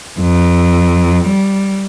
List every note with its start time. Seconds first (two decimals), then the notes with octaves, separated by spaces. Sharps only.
0.21 F2
1.28 G3